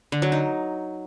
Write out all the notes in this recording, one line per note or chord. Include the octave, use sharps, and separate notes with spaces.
D3
F#3
D#4